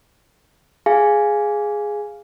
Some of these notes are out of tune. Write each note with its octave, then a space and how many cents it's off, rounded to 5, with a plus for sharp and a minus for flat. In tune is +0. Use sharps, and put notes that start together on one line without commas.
G#4 +0 F5 +0 G#5 +0